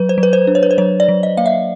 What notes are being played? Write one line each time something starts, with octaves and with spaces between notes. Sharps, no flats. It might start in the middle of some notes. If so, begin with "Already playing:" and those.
Already playing: F#3 B4
C5
F#3
B4
C5
D4
C#5
B4
C5
F#3 C#5
D5
F#3
D#5
A#3 F5
E5